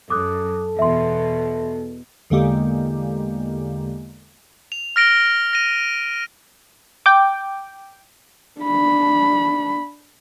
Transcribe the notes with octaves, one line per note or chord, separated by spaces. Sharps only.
F#2 A4 D6 D#6 F#6
E2 B2 E5 C6
E2 D3 G#3 A#3 G4
F7
F6 A#6 D7 G7
A#6 D#7
G5 D6
D4 B5